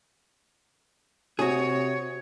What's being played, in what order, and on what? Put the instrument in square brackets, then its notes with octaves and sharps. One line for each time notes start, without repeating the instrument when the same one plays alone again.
[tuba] C3 [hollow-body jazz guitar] F#4 G#4 [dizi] C#5